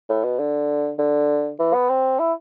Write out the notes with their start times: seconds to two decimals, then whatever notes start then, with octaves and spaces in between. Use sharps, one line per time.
0.09 A2
0.24 B2
0.39 D3
0.99 D3
1.59 E3
1.73 B3
1.90 C4
2.19 E4